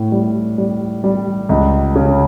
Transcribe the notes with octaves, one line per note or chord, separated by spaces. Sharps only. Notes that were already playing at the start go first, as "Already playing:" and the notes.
Already playing: A2
G3
G3
G3
C#2
C#3